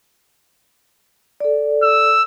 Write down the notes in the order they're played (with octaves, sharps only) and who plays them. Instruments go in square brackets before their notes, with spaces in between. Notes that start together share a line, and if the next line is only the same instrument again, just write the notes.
[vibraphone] A4 D5
[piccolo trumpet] E6